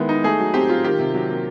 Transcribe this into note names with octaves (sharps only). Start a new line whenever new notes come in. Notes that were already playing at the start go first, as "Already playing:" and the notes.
Already playing: D#3 G#3 B3 E4
D#4
A3 G#4
F#3
C4 G4
F4
D#3 G4
C3
F#3
A#3